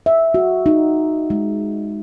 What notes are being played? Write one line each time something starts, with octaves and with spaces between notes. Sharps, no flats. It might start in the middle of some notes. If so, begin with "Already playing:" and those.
E5
F#4
D#4
G#3